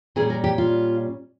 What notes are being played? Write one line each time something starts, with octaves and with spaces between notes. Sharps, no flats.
A#2 G3 C#4 G#4
A#4
G4
F4